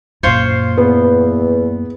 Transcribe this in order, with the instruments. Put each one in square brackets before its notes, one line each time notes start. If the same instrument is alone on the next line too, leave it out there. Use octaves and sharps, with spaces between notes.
[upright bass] F#2 A#2 [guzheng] F4 C5 C#5
[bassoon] E2 [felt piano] B3